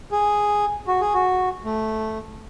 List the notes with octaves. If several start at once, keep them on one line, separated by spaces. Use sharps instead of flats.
G#4
F#4
G#4
F#4
A3